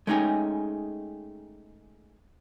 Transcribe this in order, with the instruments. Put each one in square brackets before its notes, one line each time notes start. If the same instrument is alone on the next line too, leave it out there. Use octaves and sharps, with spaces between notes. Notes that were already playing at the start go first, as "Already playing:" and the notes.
[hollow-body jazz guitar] G#3 A3 C#4 D#4 G4 G#4